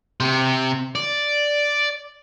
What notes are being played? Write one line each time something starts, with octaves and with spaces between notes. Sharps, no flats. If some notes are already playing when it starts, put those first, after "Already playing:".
C3
D5